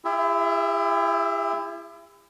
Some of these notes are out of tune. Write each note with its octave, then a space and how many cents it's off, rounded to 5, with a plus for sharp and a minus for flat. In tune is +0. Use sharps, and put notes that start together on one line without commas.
E4 +35 G4 +45 E5 -10